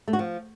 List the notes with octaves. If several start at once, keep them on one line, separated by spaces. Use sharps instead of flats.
A3
F#4
F3